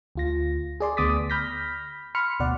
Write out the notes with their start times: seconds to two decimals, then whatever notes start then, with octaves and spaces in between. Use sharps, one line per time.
0.15 D2 F4 A#6
0.80 G#4 D5 C6
0.97 D2 B3 D6 D#6 A6 B6
1.30 B5 F6 G6 A#6 B6
2.15 B5 C6 F6 C#7
2.40 D2 B2 D5 F#5